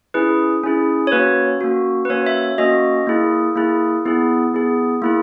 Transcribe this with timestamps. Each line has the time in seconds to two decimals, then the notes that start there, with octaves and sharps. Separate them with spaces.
0.14 C#4 E4 G#4 B4
0.63 C#4 E4 G#4
1.07 C#5
1.12 A#3 C#4 F#4 B4
1.61 A#3 C#4 F#4
2.05 B4
2.10 A#3 C#4 F#4 C#5
2.26 E5
2.58 A#3 C#4 F#4 D#5
3.07 A#3 E4 G#4
3.56 A#3 E4 G#4
4.05 B3 E4 G#4
4.54 B3 E4 G#4
5.02 A#3 E4 G#4